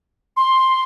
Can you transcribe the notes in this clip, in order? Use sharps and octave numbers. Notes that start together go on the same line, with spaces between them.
C6